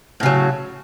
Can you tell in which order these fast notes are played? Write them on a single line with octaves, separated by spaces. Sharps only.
A2 C#3 F#3